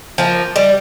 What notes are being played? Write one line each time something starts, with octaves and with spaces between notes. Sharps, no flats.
F3 A#3
G3